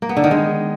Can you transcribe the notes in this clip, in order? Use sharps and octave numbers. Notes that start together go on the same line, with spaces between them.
A#3
B3
D3
D#3
G#3